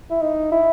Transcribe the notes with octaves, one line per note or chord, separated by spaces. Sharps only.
E4
D#4
E4